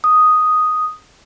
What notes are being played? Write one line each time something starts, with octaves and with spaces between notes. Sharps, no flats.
D#6